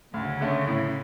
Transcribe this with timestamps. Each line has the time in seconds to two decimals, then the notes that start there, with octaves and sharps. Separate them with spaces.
0.14 D2 C#3
0.41 D3 A3 C#4
0.67 A2